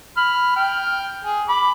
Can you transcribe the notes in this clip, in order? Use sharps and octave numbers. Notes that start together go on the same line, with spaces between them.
B5 F6
G5 F6
G#4
B5 D6